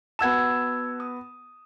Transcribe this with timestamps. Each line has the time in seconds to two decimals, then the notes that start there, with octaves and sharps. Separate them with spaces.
0.19 B3 F#4 A5 E6 G#6 E7
1.00 D#6